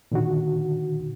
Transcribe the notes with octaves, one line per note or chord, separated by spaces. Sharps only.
A#2 D3 D#3 F#4